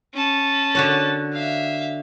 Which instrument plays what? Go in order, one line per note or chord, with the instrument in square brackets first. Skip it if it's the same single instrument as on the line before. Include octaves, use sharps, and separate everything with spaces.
[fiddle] C#4 A5
[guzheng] D3 F#4 C#5
[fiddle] E5 F5